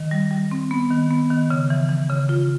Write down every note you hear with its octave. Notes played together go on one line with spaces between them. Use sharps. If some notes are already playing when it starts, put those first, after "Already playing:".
Already playing: D#3
G3
G3
C4
B3
D#3
B3
D#3
C#3
E3
E3
C#3
F4